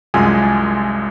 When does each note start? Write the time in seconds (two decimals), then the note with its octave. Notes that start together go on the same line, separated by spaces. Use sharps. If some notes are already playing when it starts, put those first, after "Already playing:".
0.14 C2 F#2 G#3 F4 G#5